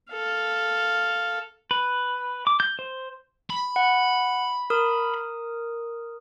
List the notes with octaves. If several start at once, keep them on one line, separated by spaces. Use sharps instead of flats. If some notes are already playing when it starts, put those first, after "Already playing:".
A4 F5
B4
D6
G6
C5
B5
F#5
A#4 D#6